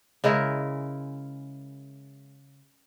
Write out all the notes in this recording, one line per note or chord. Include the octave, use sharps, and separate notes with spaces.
C#3 G#3 E4 A#4